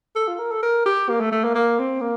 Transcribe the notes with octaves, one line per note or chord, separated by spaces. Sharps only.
A4
F4
A#4
A4
A#4
G4
A#3
A3
A3
A#3
A#3
C4
A#3